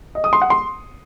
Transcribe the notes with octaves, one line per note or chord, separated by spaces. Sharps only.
D#5
D#6
C6
F#5
C6